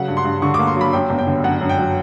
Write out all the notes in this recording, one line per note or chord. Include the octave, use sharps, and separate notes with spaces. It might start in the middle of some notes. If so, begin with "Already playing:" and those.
Already playing: C#3 F#3 F#5
G2
C6
G2
D3 C#6
D6
A#3
C6
F#3
B5
F#2 G5
G1
G5
D3
F#2 F#5
F#2
G5
F#3